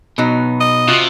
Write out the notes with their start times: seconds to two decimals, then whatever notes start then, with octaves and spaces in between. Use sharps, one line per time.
0.18 B2 F#3 B3 D#4
0.61 D#5
0.88 C3 F4 F#4